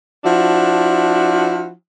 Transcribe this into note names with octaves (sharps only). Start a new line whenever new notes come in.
F3 D4 E4 F#4